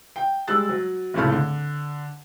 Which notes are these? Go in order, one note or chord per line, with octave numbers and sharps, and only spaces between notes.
G5
G3 G#3 E6 F#6 A6
F#3
F1 C#2 A2 A3 B5 F6
D3